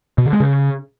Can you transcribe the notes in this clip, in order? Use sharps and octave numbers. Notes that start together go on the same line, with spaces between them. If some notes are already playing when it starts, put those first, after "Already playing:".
B2
D3
G#3
C#3